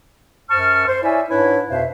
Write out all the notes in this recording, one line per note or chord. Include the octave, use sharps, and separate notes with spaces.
F#2 C5 A5 C#6 F6
C5
E4 C#5 D5 E5 G#5
G#2 D4 E4 B4 C#5
F2 B2 B4 C5 E5 F5